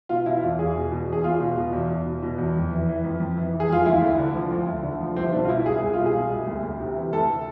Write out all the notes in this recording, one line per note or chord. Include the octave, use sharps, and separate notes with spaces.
B2 F4
B2 E4
E2 F4
E2 G#4
B2
B2
E2
G#4
E2 F4
B2
B2
E2
E2
B2
B2
E2
F2
E3
E3
F2
F2
E3
E3
G#4
F2 F4
D2 E4
D2
D3
F3
D2
D2
D3
F3
C2 C4
B2 D4
F4
B2 E4
C2 G#4
C2 G#4
F4
B2
G#4
B2
C2
D2
D2
C3
E3
D2 A4